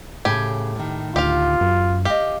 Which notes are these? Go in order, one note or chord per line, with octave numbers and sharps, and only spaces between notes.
A2 C#3 G4 G#5
A2 D#3
D2 F4 G4 F5
F#2
G4 D#5 F5